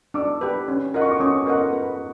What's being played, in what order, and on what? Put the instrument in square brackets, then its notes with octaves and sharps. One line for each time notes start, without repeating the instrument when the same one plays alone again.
[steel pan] D4 [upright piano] D6 E6
[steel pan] G4 B4
C#4
F4 A#4 D#5 F#5
[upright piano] C#6
D6
[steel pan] C#4 [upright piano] C#6 D#6
[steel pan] F4 A#4 D#5 F#5
B4